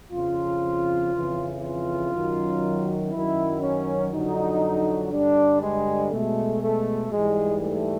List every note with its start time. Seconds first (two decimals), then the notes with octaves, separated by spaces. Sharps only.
0.12 F2 C#3 F3 F4
1.12 F2 C#3 E3
1.62 F4
2.12 F#2 D#3 F#3
3.12 F#2 D#3 F#3 E4
3.62 C#4
4.12 F2 D3 F#3 D#4
5.12 G2 D3 G3 D4
5.62 G#3
6.12 B2 G#3 A3
6.62 A3
7.12 G#2 E3 G3 G#3
7.62 A3